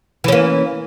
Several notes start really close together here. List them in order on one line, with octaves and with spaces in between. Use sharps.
E3 C#4 A#3